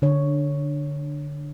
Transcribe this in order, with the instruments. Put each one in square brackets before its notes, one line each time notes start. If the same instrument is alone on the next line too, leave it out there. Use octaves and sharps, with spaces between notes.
[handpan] D3 C#5